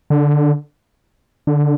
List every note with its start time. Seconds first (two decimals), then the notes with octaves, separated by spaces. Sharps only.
0.10 D3
1.47 D3